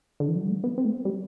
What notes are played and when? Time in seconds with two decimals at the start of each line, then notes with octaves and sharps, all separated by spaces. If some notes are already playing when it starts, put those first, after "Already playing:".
0.20 D3
0.28 E3
0.36 F#3
0.42 G3
0.50 A3
0.64 B3
0.78 C4
0.85 A3
0.91 B3
1.05 G3